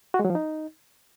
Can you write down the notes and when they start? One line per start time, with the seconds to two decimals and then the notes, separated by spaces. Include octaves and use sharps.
0.14 F#4
0.19 G#3
0.25 F#3
0.30 F3
0.35 D#4